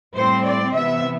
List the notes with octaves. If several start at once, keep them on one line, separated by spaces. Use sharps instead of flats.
A2 G3 C4 C5
D5
C3 E3 B3 E5